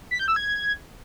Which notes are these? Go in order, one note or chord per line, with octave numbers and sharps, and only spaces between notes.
B6
G6
E6
G#6